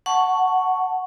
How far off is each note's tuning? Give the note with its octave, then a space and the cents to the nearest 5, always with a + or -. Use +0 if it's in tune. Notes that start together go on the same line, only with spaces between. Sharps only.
F#5 +0 A5 +0 C#6 +0